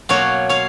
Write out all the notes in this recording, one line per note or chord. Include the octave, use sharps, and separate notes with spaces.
B2 F#3 A#3 C#5 F5
C#5 F5